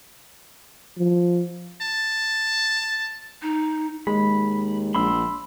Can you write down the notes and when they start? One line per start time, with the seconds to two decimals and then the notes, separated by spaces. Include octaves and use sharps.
0.98 F3
1.82 A5
3.42 D#4
4.07 D#2 G#3 B5
4.95 A#1 B5 C6 E6